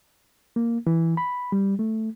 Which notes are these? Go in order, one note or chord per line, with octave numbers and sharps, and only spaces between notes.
A#3
E3
B5
G3
A3